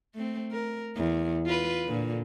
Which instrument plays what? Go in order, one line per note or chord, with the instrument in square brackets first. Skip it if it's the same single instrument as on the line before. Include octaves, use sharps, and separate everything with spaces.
[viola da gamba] A3 C4
A#4
E2
F4 B4
A#2 D3